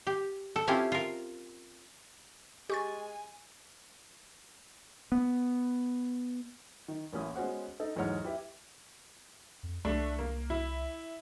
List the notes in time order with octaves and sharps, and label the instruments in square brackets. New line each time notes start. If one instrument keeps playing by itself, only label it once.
[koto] G4
A4
C4 C#4 E4 F4 G4
F4 A#4
[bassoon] G#3 [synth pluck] G4 C#6 A6 [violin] G#5
[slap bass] B3
[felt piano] D#3
A1 A#3 C#4 E4 D#6
G#3 B3 C#4 F#4 C5 F#5
D#4 A4
B1 E2 G#2 C#5 F#5 F6
E4 G4 B4 E5
[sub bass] F2
[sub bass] C2 [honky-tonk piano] A3 D4
[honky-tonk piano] A#3
E4